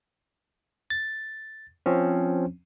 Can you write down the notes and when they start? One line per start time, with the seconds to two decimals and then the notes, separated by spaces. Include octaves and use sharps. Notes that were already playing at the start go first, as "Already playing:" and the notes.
0.90 A6
1.86 F3 C4 C#4